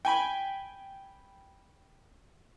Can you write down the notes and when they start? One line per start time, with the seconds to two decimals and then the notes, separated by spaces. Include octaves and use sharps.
0.05 G5 G#5 B5